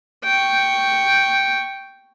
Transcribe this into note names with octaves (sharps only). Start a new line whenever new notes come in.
G5 C#6